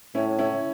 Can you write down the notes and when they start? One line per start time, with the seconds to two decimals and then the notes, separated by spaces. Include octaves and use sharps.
0.15 A2 C#4 E4
0.39 C#4 E4